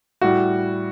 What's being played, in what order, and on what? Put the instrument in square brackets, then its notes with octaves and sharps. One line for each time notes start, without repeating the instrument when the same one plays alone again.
[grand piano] A2 G3 F#4